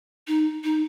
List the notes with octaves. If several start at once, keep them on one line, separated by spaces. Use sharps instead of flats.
D#4
D#4